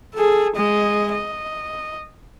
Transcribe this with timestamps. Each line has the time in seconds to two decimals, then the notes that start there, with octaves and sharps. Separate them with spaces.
0.15 G#4 A4
0.56 G#3 D#5
1.12 D#5